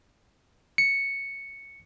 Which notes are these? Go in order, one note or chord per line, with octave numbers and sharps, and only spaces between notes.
C#7